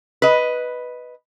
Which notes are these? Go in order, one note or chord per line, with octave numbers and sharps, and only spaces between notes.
B4 D#5